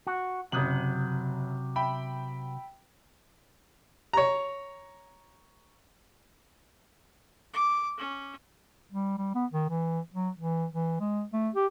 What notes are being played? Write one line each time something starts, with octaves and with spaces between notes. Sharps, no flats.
F#4
F#1 C3 F#3 D#6 F#7
E5 G5 B5
C#5 A#5
D6
C#4
G3
G3
B3
D#3
E3
F#3
E3
E3
G#3
A3
G4